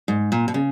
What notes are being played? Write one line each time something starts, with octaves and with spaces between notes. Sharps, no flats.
G#2
A#2
B2
C#3